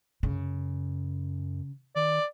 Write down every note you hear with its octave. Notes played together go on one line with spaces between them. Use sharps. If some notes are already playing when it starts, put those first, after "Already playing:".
F#2 C#3
D#3 D5